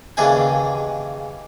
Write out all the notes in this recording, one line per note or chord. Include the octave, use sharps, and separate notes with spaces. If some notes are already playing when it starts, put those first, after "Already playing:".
D#2 C#3 E3 D4 G#4 G#5